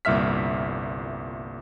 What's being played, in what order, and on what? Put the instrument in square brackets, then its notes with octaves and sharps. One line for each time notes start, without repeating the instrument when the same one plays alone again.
[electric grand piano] G1 C2 A#2 E5 F6 B6